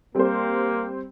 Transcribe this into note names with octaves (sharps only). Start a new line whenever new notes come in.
G3 A#3 C4 G4 C5